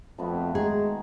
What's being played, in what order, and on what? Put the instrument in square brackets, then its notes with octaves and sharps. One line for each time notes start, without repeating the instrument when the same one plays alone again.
[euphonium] F2 [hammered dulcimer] A3 B3 F#4
[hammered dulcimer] D#3 [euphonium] G#3 [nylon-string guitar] G#4